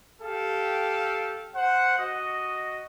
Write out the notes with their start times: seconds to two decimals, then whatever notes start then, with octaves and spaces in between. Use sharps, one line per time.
0.22 G4 A4 F5
1.55 C5 F#5
1.99 F#4 D#5